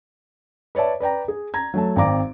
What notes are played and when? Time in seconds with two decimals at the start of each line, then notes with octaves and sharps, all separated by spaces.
0.75 B4 C#5 D5 E5 A5
1.00 B4 D5 G5 A#5
1.28 G#4
1.54 A#5 G#6
1.74 F#3 A3 A5
1.96 G#1 C4 D5 A#5 D6